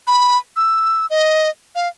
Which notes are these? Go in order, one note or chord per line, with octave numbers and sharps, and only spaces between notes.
B5
E6
D#5
F5